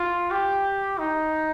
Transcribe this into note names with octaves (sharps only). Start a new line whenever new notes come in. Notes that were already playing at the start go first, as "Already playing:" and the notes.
Already playing: F4
G4
D#4